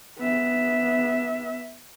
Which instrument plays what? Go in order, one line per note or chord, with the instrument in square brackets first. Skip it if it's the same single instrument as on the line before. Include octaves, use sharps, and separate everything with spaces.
[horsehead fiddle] B3 E5